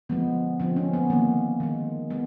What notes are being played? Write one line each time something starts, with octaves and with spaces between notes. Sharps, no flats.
D3 F3 G#3 B3
D3 F3 G#3 C4
C#4
B3
D#3 G#3 A#3
D#3 G#3
G#3 B3